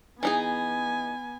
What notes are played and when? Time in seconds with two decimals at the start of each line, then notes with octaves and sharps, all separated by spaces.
0.23 E3 B3 D#4 G#4 G#5